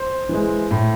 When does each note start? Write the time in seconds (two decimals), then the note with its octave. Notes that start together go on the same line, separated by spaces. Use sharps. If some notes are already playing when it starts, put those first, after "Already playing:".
Already playing: C5
0.29 E3 G#3
0.71 A2